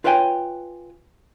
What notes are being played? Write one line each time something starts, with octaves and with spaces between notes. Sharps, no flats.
F4 B4 C#5 E5 G5 G#5